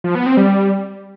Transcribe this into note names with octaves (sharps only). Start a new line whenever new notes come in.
F3
B3
C4
G3